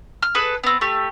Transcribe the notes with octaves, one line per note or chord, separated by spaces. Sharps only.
F6
G#4 A4 B4
B3 C4
A3 G4